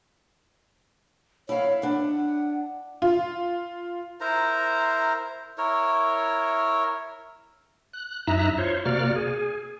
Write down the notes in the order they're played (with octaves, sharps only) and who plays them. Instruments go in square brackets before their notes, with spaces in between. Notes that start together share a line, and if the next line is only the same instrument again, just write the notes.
[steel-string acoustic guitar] E4 F5 [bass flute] C#5
[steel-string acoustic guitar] D4 [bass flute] F#5
[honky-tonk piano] F4
[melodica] E4 A#4 C5 A#5
E4 A#4 C#5
[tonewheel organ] F#6
F#2 D#4 E4 E5 A#5 F#6
F4 C5 C#5
C3 A#3 F#4 D5 F6
G#4